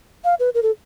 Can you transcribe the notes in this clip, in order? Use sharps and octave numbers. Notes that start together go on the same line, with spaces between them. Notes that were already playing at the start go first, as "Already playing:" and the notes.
F5
B4
A#4
A4